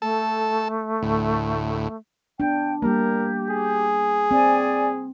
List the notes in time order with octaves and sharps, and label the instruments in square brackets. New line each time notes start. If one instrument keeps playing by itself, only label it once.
[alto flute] A3 [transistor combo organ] A4 A5
[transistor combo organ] D2 A2
[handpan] B3 D4 [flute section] G5
[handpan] G3 A#3 [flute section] G4 [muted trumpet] A#4
[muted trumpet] G#4
[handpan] C4 [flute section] D5 G#5